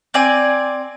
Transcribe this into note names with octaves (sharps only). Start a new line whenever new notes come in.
C4 D5 G#5